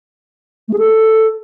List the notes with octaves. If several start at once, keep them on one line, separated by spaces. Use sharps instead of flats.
A3
G#4
A4